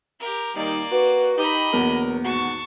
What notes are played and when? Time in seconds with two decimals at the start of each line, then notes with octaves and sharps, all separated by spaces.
0.20 G4 A#4
0.56 D#2 G3 A#3 D#4 D5
0.92 F#4 B4
1.38 D#4 G4 D#5 B5
1.73 E2 B2 D3 F#3 A#3 A#4
2.24 D#2 G#2 F#4 A5 C#6